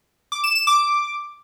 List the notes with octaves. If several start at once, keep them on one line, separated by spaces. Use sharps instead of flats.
D6
E7
E7
D6